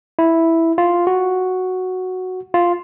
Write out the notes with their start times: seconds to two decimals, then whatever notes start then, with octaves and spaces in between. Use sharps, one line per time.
0.19 E4
0.78 F4
1.07 F#4
2.54 F4